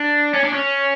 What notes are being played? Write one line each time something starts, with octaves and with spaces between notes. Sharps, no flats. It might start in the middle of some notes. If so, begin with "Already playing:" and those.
Already playing: D4
C#4
D4
C#4